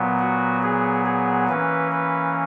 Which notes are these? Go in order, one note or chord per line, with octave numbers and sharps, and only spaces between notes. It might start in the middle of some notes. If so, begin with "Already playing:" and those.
Already playing: A#2 F#3 B3
F#4
G#4
G#4
E3 A#3 C#4 B4
B4